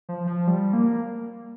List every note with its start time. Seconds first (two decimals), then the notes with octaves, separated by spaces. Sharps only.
0.09 F3
0.27 F3
0.47 G3
0.73 A#3